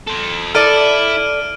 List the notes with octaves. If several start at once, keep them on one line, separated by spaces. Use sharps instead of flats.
A4 C5
E4 A4 D5 F6 D7 D#7